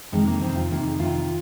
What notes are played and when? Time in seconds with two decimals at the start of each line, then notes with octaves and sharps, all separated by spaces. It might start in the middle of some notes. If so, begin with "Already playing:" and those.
0.12 F2 C3 D#3 G#3
0.27 A#3
0.41 F2 C3 D#3 C4
0.56 F4
0.71 F2 C3 D#3 A#3
0.85 G#4
0.99 F2 C3 D#3 F4